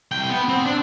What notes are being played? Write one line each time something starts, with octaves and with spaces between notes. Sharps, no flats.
C2 G5
B3
C4
D4